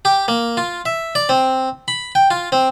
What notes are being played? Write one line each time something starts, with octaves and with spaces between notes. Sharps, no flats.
G4
A#3
F4
E5
D5
C4
B5
G5
F4
C4